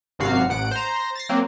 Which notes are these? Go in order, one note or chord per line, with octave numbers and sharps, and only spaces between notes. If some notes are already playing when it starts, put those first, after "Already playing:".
G#1 F#2 C3 F#4 F5 C7
A1 F#5 D7
C5 A#5
A6 A#6 C7
F#3 A#3 C4